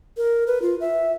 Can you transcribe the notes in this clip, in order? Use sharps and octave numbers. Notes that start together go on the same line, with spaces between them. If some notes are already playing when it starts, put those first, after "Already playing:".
A#4
B4
F4
E5